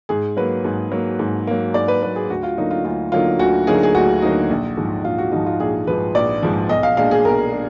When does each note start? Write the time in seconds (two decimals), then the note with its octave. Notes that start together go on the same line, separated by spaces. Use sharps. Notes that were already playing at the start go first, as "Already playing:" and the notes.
0.09 G#2 G#4
0.37 F#3 A#3 B4
0.65 G#2
0.92 F#3 A#3
1.19 G#2
1.47 F#3 A#3
1.74 G#2 D5
1.88 B4
2.02 F#3 A#3 B4
2.16 G#4
2.29 D2 F#4
2.43 F4
2.57 D3 F#3 A#3 D#4
2.71 F4
2.84 D2 F4
3.12 D3 F#3 A#3 D#4 F4
3.39 D2 F#4
3.67 D3 F#3 A#3 D#4 G#4
3.83 G#4
3.94 D2 F#4
4.22 D3 F#3 A#3 D#4
4.50 A#1
4.77 G#2 F3
5.04 A#1 F4
5.18 F#4
5.32 G#2 F3 D#4
5.46 F4
5.60 A#1 G#4
5.87 G#2 F3 B4
6.15 A#1 D5
6.43 G#2 F3
6.69 B1 D#5
6.83 F5
6.97 A#2 G#3 D4 F5
7.11 G#4
7.25 B1 A#4
7.53 G#3 D4